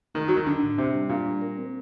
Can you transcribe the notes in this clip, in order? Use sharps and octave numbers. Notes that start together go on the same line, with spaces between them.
D#3 A3
F#3 D#4
D#3
D3 D#4
A2
C3 D4
G3
A#2 D4
G3
A#4
C4